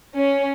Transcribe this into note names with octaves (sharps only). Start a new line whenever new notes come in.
C#4